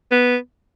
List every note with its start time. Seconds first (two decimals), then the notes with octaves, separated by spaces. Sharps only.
0.12 B3